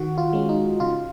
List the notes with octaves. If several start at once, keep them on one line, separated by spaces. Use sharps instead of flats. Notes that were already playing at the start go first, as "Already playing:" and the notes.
Already playing: D#3 F#4
F4
G#3 C#4
D#4
C#3 F4